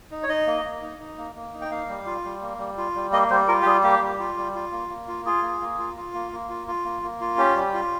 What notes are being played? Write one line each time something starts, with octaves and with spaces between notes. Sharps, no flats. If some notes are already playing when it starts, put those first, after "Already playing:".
D#4
C#5
D#4 D#5
A#3
A#3
D#4
D#4
A#3
A#3
D#4
G5
A#3 F5
G3
F4
G3
A#3
G3
F4
G3
A#3 D#5
G3 C5
F4 A#4
G4
G3 G#4
A#3 G4
G3
F4
G3
F4
A#3
A#3
F4
F4 G#4
A#3
A#3
F4
F4
A#3
A#3
F4
F4
A#3
A#3
F4
C#4 G4
G3
F4